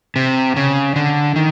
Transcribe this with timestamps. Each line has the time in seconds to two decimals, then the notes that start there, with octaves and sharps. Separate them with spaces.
0.16 C3
0.56 C#3
0.96 D3
1.36 D#3